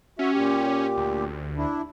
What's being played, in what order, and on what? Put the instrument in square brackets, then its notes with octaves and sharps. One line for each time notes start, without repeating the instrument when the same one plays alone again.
[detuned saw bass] C#4 [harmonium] F#4 E5
[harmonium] A#2 G4
[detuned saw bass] D2
[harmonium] D4 E4